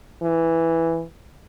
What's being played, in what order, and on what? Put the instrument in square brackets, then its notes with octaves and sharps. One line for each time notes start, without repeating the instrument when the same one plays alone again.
[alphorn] E3